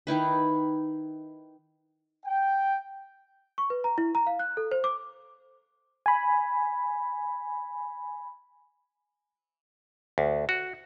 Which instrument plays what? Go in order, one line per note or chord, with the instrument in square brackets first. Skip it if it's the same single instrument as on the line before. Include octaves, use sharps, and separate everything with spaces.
[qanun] D#3 D#4 E4 B4
[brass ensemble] G5
[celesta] C#6
B4
A#5
E4
A#5
F5
F#6
A4
C5
D6
[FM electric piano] G#5 B5
[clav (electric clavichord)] D2
F#4